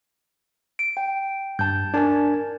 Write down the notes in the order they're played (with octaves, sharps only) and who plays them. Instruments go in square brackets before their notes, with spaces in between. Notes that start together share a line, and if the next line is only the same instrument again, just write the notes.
[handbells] D7
G5
[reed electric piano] G2 [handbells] A5 G6
[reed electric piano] D4 G#5 [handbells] A#4 A5 G#6